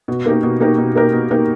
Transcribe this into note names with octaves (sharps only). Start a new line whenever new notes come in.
B2
A#3 D#4 G4 A#4
B2
A#3 D#4 G4 A#4
B2
A#3 D#4 G4 A#4
B2
A#3 D#4 G4 A#4